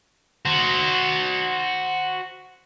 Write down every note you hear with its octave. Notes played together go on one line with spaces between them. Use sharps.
F#4 C5